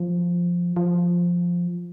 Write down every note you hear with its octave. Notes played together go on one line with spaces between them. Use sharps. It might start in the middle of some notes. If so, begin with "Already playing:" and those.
Already playing: F3
F3